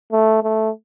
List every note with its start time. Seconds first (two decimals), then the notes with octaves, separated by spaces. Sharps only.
0.12 A3
0.43 A3